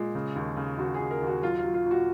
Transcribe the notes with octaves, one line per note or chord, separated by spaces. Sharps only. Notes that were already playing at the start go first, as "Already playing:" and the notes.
Already playing: A#2 G#3
C#3
D#2
C#3
D#2 F#4
G#4
D#2
A#4
D#2
F#4
F#3 F4
F4
F#3
F4
A#2
F#4